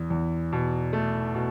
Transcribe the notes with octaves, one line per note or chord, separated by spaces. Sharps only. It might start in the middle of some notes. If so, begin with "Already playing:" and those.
Already playing: E2
E2
B2
A3
B2